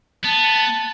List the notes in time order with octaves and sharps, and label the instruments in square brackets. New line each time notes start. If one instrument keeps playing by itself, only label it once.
[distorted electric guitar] B3 [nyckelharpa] A5